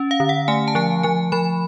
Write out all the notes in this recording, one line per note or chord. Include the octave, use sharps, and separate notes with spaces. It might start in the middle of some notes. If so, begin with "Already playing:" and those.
Already playing: C#4
F5
D3
F#5
A3 G#5
A5
F3 G#5
F3 G#5
F3 B5